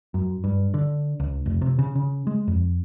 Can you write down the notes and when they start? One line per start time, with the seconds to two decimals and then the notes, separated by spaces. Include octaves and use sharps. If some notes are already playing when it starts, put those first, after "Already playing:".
0.14 F#2
0.44 G2
0.74 D3
1.20 C#2
1.46 F1
1.62 C3
1.79 C#3
1.95 C#3
2.27 G#3
2.48 F2